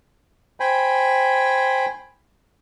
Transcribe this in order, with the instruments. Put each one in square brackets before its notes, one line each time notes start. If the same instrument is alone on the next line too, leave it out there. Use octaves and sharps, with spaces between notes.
[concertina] C5 G5 G#5 B5